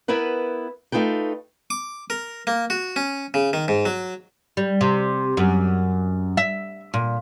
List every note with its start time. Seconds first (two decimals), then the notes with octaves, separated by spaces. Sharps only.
0.08 B3 E4 A#4 B4 F#5
0.92 A3 D#4 F4 B4 G5
1.70 D6
2.10 A#4
2.47 A#3
2.70 F#4
2.96 C#4
3.34 C#3
3.53 D#3
3.68 G#2
3.86 F#3
4.57 G3
4.81 C3
5.37 F#2
6.37 E5
6.94 A#2